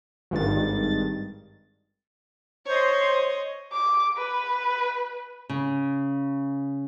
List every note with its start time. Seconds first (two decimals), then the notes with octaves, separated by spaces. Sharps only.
0.31 G#1 G2 D#3 A6
2.66 C5 C#5 D#5
3.73 D6
4.18 B4
5.49 C#3